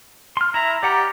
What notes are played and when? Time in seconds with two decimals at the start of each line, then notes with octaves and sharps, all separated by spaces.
0.37 C6 F6
0.54 E4 E5 A#5
0.83 G4 D5 F#5 A#5